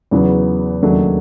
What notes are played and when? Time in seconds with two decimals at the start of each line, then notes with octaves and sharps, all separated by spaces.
0.11 E2 C#3 F#3 B3
0.83 D#2 C#3 F#3 A3 D4